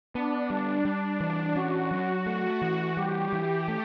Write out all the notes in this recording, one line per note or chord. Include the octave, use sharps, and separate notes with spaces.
B3 D4
G3
G3 D4
E3
C#4 F#4
F#3
A3
E3
G3 G4
E3
A3